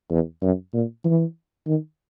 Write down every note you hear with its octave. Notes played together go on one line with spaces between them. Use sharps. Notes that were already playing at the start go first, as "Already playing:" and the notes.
E2
F#2
A#2
E3
D#3